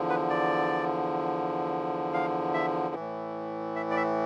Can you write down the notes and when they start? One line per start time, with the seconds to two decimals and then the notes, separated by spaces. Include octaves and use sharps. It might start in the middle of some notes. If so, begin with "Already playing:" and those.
Already playing: E2 D3 F3
0.09 B4
0.30 D5
2.14 F5
2.54 E5
2.95 A2 E3
3.76 E5
3.90 D5
3.97 E5